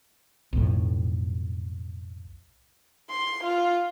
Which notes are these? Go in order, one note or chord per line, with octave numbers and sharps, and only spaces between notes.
B1 F2 A2
C6
F4